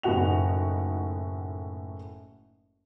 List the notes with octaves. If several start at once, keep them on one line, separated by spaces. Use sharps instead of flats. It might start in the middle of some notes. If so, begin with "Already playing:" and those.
F#1 A2 D#4 F#4 F#5 F7